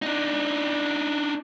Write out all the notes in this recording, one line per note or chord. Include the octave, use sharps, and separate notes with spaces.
D4 D#4